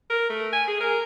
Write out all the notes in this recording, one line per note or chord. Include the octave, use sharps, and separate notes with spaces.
A#4
A3
G#5
G#4
A#4